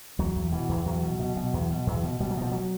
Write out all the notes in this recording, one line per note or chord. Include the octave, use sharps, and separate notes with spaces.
E2 F#3
E2
B2 E3
E2
E2 F#3
B2
B2
B2
E2
B2
E2
B2
B2 G3
F#3
B2 F3
F#3